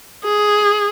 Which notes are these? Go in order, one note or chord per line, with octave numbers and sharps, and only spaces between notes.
G#4